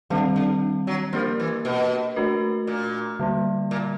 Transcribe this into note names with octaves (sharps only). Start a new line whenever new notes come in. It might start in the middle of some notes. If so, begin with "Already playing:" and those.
D3 D#3 G3 C4
D3
F#3
F3 A#3 D4 G4 A#4
E3
B2
A3 D4 F#4 A#4
A#2
D3 G3 A#3
A#2